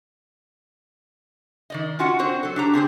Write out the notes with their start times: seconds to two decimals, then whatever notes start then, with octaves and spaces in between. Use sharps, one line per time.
1.70 D#3 D5 D#5
1.99 C#4 F4 F#4 F#5
2.19 C4 D4 F#4 C5
2.43 F#3 A4
2.56 D4 G4 A#5
2.74 D3 C4 G#4 C5